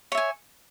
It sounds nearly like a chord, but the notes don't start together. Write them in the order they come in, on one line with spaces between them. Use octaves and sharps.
C#5 E5 G#5